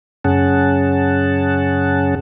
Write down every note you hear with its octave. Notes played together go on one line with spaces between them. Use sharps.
F#2 C#3 C#4 G#4 F#5 A5